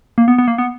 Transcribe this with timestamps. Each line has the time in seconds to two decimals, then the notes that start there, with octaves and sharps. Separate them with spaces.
0.18 A#3
0.28 B3
0.38 B3
0.48 A#3
0.58 B3